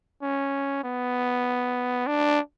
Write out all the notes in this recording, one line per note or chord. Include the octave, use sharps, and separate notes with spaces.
C#4
B3
D4